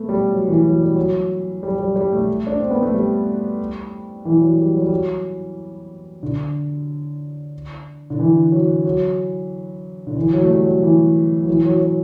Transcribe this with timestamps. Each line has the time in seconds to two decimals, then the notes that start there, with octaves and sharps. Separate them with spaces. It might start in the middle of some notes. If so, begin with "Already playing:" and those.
Already playing: A3 B3
0.09 G3
0.31 F#3
0.48 E3
0.64 F#3
0.80 G3
0.96 F#3
1.63 G3
1.78 G3
1.96 G3
2.12 A3
2.47 D4
2.58 C4
2.71 B3
2.82 A3
2.94 G3
4.25 E3
4.41 F#3
4.57 G3
4.74 F#3
4.82 G3
4.89 F#3
6.23 D3
8.10 D3
8.20 E3
8.52 F#3
8.86 F#3
10.07 D3
10.17 E3
10.33 F#3
10.43 A3
10.50 G3
10.65 F#3
10.83 E3
11.43 F#3
11.48 E3
11.65 F#3
11.81 F#3